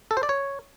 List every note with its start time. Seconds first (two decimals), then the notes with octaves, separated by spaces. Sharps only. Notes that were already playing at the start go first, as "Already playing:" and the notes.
0.11 A4
0.17 C5
0.23 D5
0.29 C#5